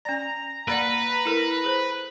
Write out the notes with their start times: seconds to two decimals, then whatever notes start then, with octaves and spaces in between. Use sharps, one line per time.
0.05 C#4 D5 A#5
0.68 A#3 B4 D5 F#5
1.25 E4 A4 A#4
1.64 G#4 C5